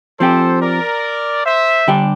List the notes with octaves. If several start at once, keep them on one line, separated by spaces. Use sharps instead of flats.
F3 C4 G4 A4 C5
A#4 D5
C5 E5
D3 G3 D4 G4